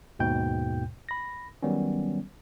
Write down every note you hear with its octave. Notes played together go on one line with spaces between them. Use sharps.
D#2 G#2 B2 G5 G6
B5 A#6
D#3 F#3 G3 B3 C#4